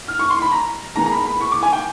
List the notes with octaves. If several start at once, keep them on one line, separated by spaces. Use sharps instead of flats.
F6
C#6
C6
B5
A#5
D#3 G#3 B3 A#5
A#5
B5
B5
C#6
D6
G#5
G5